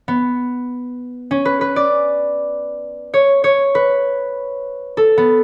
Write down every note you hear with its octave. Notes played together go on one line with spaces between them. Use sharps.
B3
C#4
B4
B4
D5
C#5
C#5
B4
A4
B3